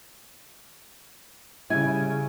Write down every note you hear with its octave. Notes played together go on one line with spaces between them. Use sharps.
C#3 G3 E4 G#5